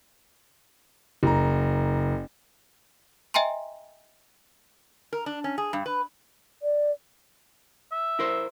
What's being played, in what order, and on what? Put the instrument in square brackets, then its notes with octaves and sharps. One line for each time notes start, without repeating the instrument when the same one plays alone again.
[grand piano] F#1 A#5
[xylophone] D#5 E5 G5 G#5 A#5 C6
[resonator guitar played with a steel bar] A#4
D4
C#4
G#4
G2
B4
[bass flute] D5
[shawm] E5
[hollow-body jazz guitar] E4 A#4 C5